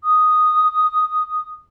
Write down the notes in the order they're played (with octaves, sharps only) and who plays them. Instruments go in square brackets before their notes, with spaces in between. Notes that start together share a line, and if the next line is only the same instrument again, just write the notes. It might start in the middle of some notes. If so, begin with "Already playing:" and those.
[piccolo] D#6